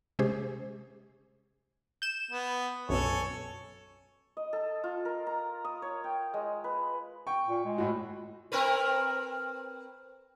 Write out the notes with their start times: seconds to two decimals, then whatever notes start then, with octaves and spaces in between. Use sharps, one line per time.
0.19 C3 G#3 C#4 G4 G#4 C5
2.02 G6 E7
2.31 B3
2.89 B1 F#2 B2 A4 C#5 G#5
4.37 D#5
4.53 A4
4.84 F4
5.05 A#4
5.27 A#5
5.65 D#6
5.82 C#5
6.04 G5
6.34 G#3
6.64 B4
7.27 G5 C#6
7.49 A#2
7.65 G#3
7.78 A2 F#4
8.52 C4 A#4 B4